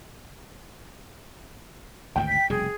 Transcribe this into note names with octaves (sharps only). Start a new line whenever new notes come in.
G#1 D2 G#2 G5
B6
F1 B2 G3 G#4